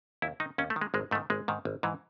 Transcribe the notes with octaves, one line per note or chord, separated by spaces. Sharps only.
D#2 E4
D#3 D#4
D#2 C#4
A3
D#3
G#3
G#1 G#3
G#2 D#3 A3
G#1 G#3
G#2 D#3
G#1
G#2 E3